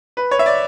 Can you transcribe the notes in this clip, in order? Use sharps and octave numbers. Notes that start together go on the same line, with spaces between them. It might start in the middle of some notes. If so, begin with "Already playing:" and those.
B4
C#5
E5
D5